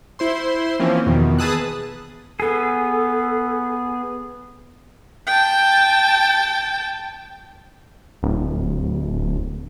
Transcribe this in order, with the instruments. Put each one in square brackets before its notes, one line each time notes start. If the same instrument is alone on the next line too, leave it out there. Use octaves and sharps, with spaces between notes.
[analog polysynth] E4 C5 C6
E3 F3 A#3 C4 C#4
E2 B2 D#3
G#4 B4 A5 D#6 E6 F#6
[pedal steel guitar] B3 G#4 [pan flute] A4
[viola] G5 A5
[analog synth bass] D1